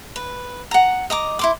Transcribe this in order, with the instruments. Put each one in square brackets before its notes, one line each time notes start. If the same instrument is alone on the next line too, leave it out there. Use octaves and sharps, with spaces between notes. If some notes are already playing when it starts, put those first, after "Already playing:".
[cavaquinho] B4
F#5 A#5
D#5 A#5 D6
E4 C6 D6